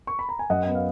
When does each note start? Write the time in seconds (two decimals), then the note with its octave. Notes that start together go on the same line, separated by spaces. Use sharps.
0.07 C#6
0.19 B5
0.29 A#5
0.39 G#5
0.50 F#2 D#5 F#5
0.64 B3 F#5
0.75 F5